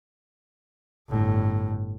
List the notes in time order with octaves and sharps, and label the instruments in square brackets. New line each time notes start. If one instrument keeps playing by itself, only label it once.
[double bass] G1 A2